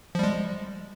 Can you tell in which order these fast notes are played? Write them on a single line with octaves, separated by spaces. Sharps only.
F3 G3 G#3